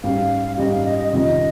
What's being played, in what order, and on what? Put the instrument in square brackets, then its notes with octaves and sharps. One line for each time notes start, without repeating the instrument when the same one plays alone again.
[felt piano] G#2 G3 C#4 G4 [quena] F5
[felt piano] G#2 G3 C#4 G4 [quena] D#5
[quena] F5
D#5
D#5
[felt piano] F2 C3 D#3 G#3 C#4 [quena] D#5